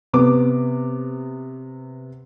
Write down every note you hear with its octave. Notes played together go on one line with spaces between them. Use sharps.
C3 B3 D6